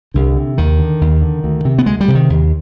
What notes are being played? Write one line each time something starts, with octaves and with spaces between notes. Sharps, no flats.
C2 D3
C3
D#2 D#3
D3
D#2
D3
D2
C3
B3
D2 G#3
G3
C3
D#3
D#2